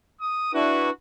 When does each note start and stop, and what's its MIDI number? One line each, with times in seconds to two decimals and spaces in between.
0.21 0.50 87
0.54 0.90 62
0.54 0.90 64
0.54 0.90 66
0.54 0.90 71